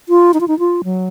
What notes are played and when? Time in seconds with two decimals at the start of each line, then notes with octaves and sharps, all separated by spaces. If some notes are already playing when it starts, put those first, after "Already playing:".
0.09 F4
0.34 D#4
0.41 F4
0.48 D#4
0.59 F4
0.84 F#3